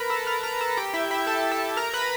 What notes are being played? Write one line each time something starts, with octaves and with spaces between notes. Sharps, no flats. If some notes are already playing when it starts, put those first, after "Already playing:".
Already playing: A#4 B4 A#5 B5
A4 A5
A#4 A#5
A#4 A#5
A4 A5
G4 G5
E4 E5
E4 E5
A4 A5
A4 A5
A#4 A#5
B4 B5